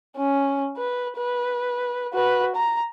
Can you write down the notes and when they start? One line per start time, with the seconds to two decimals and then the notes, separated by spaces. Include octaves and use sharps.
0.17 C#4
0.77 B4
1.17 B4
2.13 F#4 B4
2.56 A#5